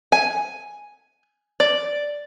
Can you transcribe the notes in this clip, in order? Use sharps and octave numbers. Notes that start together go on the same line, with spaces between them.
G#5
D5